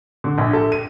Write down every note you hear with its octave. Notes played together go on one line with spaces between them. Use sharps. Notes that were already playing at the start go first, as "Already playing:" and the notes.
D3
A#1
A4
D#7